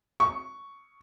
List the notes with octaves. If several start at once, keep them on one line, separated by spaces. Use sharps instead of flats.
C#6